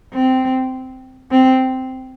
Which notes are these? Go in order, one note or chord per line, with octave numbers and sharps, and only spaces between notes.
C4
C4